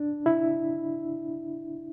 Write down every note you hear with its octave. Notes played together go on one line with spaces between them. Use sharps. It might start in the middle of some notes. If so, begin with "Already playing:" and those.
Already playing: D4
E4